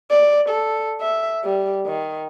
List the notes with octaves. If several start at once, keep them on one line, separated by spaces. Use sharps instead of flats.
D5
A4
E5
G3
D#3